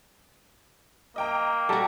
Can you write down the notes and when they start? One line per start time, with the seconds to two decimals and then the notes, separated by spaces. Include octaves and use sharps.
1.16 A#3 D#5 G5 A#5
1.69 G3 F#4 A4 A5 A#5